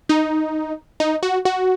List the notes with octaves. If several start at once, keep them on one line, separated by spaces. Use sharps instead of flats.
D#4
D#4
F#4
F#4